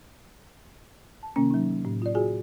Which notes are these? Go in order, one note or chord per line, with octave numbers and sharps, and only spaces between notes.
A5
C3 D#3 A#3 C#4
F#3 D#4
A2
F4 D5
F4 F#4 G#4 G#5